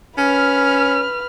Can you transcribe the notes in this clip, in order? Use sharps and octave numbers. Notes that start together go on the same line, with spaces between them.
C#4 B4 F6